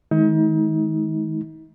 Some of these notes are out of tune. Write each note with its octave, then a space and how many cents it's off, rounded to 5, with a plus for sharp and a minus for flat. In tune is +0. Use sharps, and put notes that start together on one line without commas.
D#3 +30 G#3 +40 D#4 +35